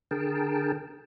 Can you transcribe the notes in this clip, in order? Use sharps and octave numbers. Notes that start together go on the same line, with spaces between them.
D3 G#4 A#4 G5 A5